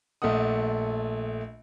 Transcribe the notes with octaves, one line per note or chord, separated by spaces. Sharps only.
A#1 A3 D#5 F#5 D#6